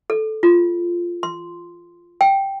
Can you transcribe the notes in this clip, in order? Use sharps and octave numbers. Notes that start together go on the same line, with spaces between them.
A4
F4
C6
G5